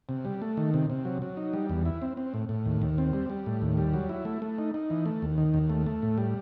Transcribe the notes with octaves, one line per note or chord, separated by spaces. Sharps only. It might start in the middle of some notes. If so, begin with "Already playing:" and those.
C3
G3
A3
D#3
C3
C3
F#3
F#3
D#4
G3
E2
E4
C4
C4
A2
A2
D#2
D#2
C4
G3
G3
A2
D#2
G3
F#3
E4
A3
A3
D#4
D#4
E3
A3
D#2
D#3
D#2
A3
A3
A2
G3